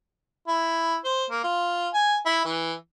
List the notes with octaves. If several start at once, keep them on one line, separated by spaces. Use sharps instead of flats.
E4
C5
A#3
F4
G#5
E4
E3